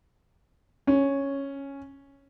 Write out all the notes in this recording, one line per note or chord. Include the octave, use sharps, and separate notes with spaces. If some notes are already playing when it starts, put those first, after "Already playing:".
C#4